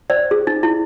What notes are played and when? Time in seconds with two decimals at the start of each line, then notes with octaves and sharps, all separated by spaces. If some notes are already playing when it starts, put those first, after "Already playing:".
0.10 C5 D5
0.31 G#4
0.47 D#4
0.63 E4